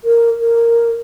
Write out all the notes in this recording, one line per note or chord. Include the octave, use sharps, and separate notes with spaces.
A#4
A#4